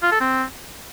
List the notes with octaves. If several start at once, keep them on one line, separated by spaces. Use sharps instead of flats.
F4
A4
C4